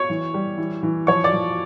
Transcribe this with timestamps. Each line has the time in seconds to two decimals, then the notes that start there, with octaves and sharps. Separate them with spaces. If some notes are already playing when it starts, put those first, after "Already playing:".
Already playing: C#5 C#6
0.10 E3
0.34 G3
0.58 E3
0.83 E3
1.07 F3 C#5 C#6
1.24 D5 D6
1.33 F3